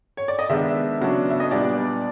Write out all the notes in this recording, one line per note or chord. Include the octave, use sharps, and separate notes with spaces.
C#5
D5
D#5
D#3 G#3 B3 D4 E5
C#3 F#3 B3 D4
E5
D#5
A#2 G3 B3 D4 D5